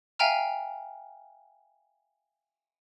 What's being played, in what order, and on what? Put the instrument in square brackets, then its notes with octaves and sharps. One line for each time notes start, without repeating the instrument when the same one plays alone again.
[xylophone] E5 F5 G5 G#5 A#5 F6